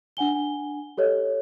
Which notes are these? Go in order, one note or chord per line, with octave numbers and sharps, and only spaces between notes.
D4 F#5 G#5 G7
G4 A4 C#5 D#5